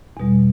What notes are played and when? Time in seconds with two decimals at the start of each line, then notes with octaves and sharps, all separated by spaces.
0.17 E2 B2 G3